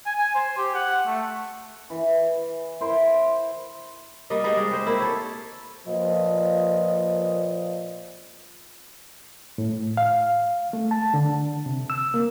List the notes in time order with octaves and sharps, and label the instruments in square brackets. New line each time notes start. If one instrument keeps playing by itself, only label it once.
[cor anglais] G#5
G#5
C5
G4
F#5
A3
[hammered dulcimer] E3
E4 A#4 C5
[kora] G3 A#3 D#5
G3 G#3 C4 D#4
G#3
G4 C5
A#3 E4
A4 C#5
[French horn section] A#2 F3 B4 D#5
[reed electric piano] A2
F5
A3
A5
D3
C3
E6
A#3